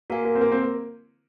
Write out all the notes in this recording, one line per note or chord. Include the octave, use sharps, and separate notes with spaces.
A#3 F#4 A#4 F5 G#5
A#3
C4
A#3
C4
A#3